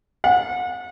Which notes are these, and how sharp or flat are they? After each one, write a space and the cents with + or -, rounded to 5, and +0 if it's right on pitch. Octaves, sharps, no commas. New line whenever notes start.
F#5 -35